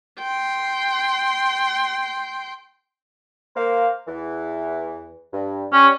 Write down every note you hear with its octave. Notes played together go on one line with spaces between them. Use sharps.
G5 C6
A#3 C5 F5
E2 E3
G2
C#4 G4 C#5 D5